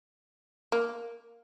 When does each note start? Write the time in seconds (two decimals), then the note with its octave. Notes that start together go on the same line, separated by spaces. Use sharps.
0.72 A#3